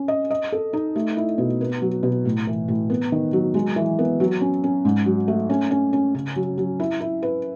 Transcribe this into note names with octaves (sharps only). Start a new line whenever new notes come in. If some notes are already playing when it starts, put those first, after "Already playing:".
Already playing: C#4
D#5
D#5
A4
D#4
A3
E4
B2
B3
F#3
B2
A2
E3
A2
B3
D#3
F#3
G#3
E3
B3
F#3
C#4
C#4
G#2
F#3
A3
C#4
C#4
C#4
C#3
F#3
F#3
E4
E4
B4